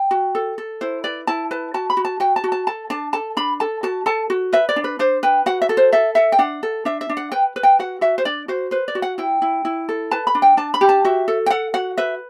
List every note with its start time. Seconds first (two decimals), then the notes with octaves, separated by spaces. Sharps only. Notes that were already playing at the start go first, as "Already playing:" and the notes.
Already playing: G5
0.11 F#4
0.35 A4
0.58 A4
0.81 E4 C5
1.04 B4 D5
1.27 E4 A5
1.51 B4 A5
1.74 F#4 A5
1.90 B5
1.97 F#4
2.05 A5
2.20 F#4 G5
2.36 A5
2.44 F#4
2.52 A5
2.67 A4 A5
2.90 D4 A5
3.13 A4 A5
3.37 D4 B5
3.60 A4 A5
3.83 F#4 A5
4.06 A4 A5
4.30 F#4
4.53 B4 E5
4.69 D5
4.76 D4
4.84 B4
4.99 D4 C5
5.23 B4 G5
5.46 F#4 F#5
5.62 E5
5.69 A4
5.77 C5
5.93 A4 E5
6.15 A4 E5
6.32 G5
6.39 D4 F#5
6.63 A4
6.85 D4 E5
7.01 E5
7.10 D4
7.17 F#5
7.32 B4 G5
7.56 B4
7.63 G5
7.79 F#4 F#5
8.01 F#4 E5
8.18 C5
8.25 D4 D5
8.48 F#4 C5
8.71 B4 C5
8.88 D5
8.95 F#4
9.02 F#5
9.18 E4 G5
9.42 E4
9.65 E4
9.89 A4
10.11 B4 A5
10.27 B5
10.35 D4
10.42 G5
10.57 D4 A5
10.74 B5
10.81 G4
10.89 A5
11.05 F#4 E5
11.28 A4
11.46 G5
11.50 A4 F#5
11.74 F#4 F#5
11.98 B4 E5